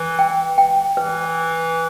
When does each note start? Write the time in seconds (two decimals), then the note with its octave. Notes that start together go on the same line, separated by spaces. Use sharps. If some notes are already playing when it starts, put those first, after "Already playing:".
Already playing: E3
0.19 G5
0.58 G5
0.97 E3 B4